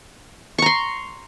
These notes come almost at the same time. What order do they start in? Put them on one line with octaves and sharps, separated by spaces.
C#6 A#5 C6